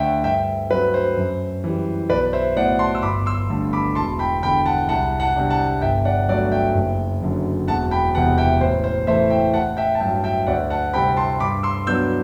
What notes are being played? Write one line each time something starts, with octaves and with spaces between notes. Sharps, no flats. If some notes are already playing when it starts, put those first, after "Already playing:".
Already playing: D2 D3 A3 D5 E5 F#5 G5
G2 E5 G5
F#3 C4 B4
C5
F#2
E3 G3
B1 B4 D5
C5 E5
A2 F#3 B3 D5 F#5
A5 C6
E6
G1 B5 D6
C6 E6
G2 D3 A3
B5 D6
E1 A5 C6
G5 B5
E2 D3 G5 B5
F#5 A5
C2 F#5 A5
F#5 A5
C3 G3 D4
F#5 A5
G1 E5 G5
D5 F#5
G2 F#3 A3 D5 F#5
E5 G5
F#1
F#2 D3 F#3
E1 F#5 A5
G5 B5
E2 C3 E3 B3 F#5 A5
E5 G5
A1 C5
C5
A2 E3 A3 C5 E5
E5 G5
A1 F#5 A5
E5 G5
A5
G2 F#3 E5 G5
E5 G5
D2 D5 F#5
F#5 A5
C3 G3 C4 G5 B5
A5 C6
G2 B5 D6
C6 E6
F#3 B3 D4 E6 G6